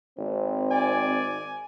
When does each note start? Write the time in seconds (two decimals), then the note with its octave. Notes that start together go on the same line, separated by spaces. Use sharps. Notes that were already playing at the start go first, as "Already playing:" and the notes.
0.18 G#1 C4
0.71 D5 G#5